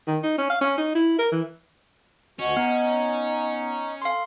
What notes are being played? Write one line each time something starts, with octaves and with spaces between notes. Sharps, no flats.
D#3
D#4
C#4
F5
C#4
D#4
E4
A#4
E3
D2 C#4 F#4 D#5
B3 D#4
A4 F5 C6